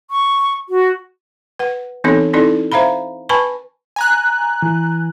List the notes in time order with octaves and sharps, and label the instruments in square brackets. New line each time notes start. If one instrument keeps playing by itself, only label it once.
[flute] C#6
F#4
[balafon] B4 F#5
E3 B3 C4 D#4 A4 C#5
C4 D#4 E4 A4 D5
C5 E5 F5 A#5 B5
B4 G#5 A5 B5 C#6
[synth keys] G#5 A#5 F#6
[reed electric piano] E3